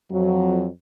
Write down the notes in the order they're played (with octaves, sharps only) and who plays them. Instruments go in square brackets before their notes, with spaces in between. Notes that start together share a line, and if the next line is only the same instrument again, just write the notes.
[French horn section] F2 F#3